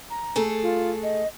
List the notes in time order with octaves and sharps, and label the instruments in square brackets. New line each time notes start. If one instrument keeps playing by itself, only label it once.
[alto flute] A#5
[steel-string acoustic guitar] A3 G#4 A4
[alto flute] F4
D#5